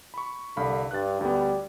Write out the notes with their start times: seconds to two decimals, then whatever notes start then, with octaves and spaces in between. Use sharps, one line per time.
0.14 B5 C#6
0.57 C2 D3 F5 B5
0.91 G2 F#6 A6
1.21 D2 G3 B3